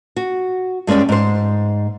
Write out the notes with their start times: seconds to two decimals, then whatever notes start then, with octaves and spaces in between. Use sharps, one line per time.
0.16 F#4
0.87 G2 G#3 C#4 D5 G5
1.09 G#2 C5